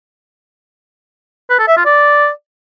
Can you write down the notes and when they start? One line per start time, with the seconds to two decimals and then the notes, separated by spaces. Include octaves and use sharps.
1.50 B4
1.59 A4
1.68 E5
1.77 F4
1.86 D5